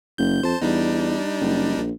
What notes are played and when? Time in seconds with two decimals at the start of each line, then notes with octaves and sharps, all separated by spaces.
0.18 F#1 G6
0.43 F2 C5 A5
0.61 E2 G3 D4 D#4
1.40 F#1
1.77 A#1